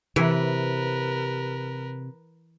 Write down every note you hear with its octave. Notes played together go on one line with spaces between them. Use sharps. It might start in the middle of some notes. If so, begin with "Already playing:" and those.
C3 E3 A#4 B4